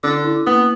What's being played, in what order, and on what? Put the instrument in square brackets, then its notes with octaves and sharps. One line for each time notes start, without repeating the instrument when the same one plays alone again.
[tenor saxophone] D3 [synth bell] C#4
[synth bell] E4
[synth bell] A#3 [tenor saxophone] B3